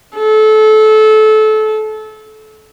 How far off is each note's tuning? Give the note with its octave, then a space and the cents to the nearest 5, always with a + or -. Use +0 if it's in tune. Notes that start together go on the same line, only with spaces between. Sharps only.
A4 -25